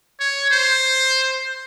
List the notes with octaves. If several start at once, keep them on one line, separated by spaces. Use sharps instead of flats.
C#5
C5